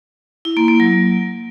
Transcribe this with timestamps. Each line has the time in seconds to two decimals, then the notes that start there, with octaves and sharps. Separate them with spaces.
0.45 E4
0.57 A#3
0.68 A#3
0.80 F#3